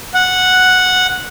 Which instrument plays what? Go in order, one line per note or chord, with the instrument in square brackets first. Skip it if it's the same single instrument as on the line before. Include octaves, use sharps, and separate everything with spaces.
[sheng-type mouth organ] F#5